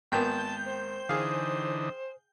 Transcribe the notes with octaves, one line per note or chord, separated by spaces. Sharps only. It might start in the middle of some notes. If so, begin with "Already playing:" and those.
G#1 A#3 B3 G5 A5 G6
C5
D3 E3 D#4 G#4 F5